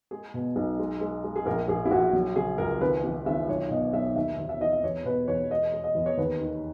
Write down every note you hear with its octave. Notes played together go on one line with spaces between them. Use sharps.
G#3 G#4
B2
B1
G#3
G#3
G#3
G#4
A#1 A#4
A#1 G#4
E4
A#1 F#4
F#3
C#3 G#4
C#2 A#4
G#1 B4
E3
G#1 E5
B1 C#5
B2 D#5
B1 E5
D#2 E5
D#2
E5
E3 D#5
E5
E2 C#5
B2 B4
E2 C#5
G#3 D#5
G#3
D#5
E2
C#5
D#2 B4
D#3